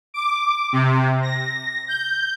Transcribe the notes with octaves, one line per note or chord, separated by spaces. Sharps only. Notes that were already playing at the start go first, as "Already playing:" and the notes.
D6
C3
A#6
G6